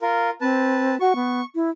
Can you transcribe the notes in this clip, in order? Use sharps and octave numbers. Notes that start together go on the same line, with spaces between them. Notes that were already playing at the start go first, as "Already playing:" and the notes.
F4 A#4
C4 B4 A5
F#4 C#6
B3
E4